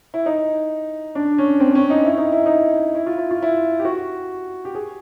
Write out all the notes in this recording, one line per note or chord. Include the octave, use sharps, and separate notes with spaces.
E4
D#4
D4
C#4
C4
C4
C#4
D#4
E4
D#4
E4
D#4
E4
F4
E4
F4
E4
G4
F#4
G4
G#4